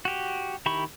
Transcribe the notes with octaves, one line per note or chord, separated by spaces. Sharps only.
F#4 G4
D#3 E4 G4 B5 C#6